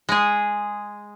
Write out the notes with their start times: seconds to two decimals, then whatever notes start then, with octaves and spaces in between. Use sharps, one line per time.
0.09 G#3 G#4